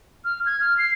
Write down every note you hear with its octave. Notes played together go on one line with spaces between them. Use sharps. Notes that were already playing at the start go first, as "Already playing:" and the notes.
F6
G#6
F6
C7